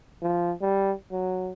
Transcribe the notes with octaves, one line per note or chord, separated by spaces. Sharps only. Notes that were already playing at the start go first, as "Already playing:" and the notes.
F3
G3
F#3